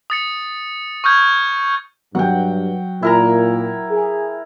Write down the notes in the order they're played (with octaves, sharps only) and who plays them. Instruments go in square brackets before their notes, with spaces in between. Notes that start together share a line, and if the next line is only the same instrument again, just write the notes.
[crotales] D#6 A6 C#7
C#6 D#6 F6 G6 G#6
[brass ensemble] G2 [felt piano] F#3 [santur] F#5 G5
[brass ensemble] A#2 [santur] E4 A#4 A#5
[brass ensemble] G#4